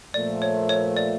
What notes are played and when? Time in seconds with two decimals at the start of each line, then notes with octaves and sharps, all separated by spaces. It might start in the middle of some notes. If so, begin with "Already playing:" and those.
0.14 A#2 F3 A3 D5
0.42 C#5
0.69 C#5
0.97 D5